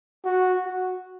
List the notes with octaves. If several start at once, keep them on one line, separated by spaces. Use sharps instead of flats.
F#4
F#4